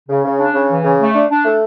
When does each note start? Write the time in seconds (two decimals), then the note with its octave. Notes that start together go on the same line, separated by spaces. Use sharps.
0.09 C#3
0.25 C#3
0.40 D4
0.54 C#3
0.70 E3
0.84 C#3
1.00 A3
1.15 D4
1.30 D4
1.45 A3